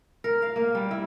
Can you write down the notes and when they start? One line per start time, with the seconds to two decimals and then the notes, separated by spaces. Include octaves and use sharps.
0.24 A#4
0.42 F5
0.56 A#3
0.75 G3
0.91 E4